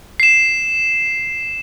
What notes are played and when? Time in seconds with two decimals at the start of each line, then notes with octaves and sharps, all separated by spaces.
0.20 C7 E7